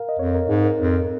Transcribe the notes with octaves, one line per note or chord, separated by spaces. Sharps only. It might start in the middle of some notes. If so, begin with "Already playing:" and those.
Already playing: A#4 F5
D#5
F2 C#5
A#4
G#2 G#4
A#4
F2